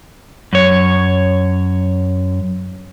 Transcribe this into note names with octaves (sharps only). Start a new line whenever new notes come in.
F#2 C#5